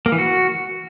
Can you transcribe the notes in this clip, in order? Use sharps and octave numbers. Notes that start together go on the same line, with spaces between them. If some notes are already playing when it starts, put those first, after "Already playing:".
A#3
E3
F#4